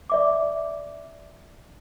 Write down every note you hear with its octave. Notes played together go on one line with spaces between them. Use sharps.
D5 E5 D6